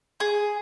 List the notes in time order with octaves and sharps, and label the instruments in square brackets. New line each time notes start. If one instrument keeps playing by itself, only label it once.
[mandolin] G#4